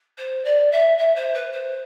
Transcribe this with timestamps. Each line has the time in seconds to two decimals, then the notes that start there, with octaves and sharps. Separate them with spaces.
0.17 C5
0.44 D5
0.71 E5
0.98 E5
1.16 C5
1.34 B4
1.52 C5